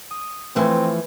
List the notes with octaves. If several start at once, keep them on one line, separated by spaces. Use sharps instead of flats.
D#6
E3 F3 A3 C4 B4 E5 G#6